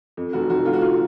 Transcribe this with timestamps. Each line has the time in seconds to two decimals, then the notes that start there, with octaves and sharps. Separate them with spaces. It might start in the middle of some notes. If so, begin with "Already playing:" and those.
0.17 F2
0.33 F1 F#4
0.49 F1 F#4
0.66 D3 F4
0.73 F#4
0.81 F4